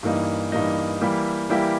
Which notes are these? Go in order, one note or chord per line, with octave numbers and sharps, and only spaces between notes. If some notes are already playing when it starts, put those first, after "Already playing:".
G2 E3 A#3 D#4
G2 E3 A#3 D#4
E3 G3 A#3 E4 G4
E3 G3 A#3 E4 G4